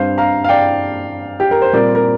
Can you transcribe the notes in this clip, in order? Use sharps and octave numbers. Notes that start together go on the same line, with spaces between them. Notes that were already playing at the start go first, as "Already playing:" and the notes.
Already playing: G2 G3 C4 C5 F5
F5 A#5
F5
D5 G5
G4
A#4
C5
A#2 G3 C4 A#4 D5
A#4